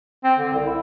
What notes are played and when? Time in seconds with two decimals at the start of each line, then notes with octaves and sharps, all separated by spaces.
0.24 C4
0.39 D3
0.54 C2
0.67 E4